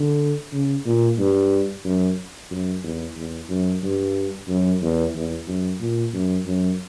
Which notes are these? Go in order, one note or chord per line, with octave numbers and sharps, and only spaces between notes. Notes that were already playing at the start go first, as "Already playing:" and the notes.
Already playing: D3
C#3
A#2
G2
F#2
F#2
E2
E2
F#2
G2
F#2
E2
E2
F#2
A#2
F#2
F#2